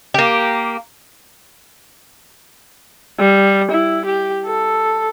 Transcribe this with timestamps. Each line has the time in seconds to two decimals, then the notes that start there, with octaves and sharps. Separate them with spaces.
0.14 A#3 G4
3.19 G3
3.71 E4
4.05 G4
4.46 A4